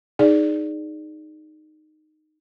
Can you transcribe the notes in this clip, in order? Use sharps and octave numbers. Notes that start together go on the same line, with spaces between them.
D#4 G#4 D5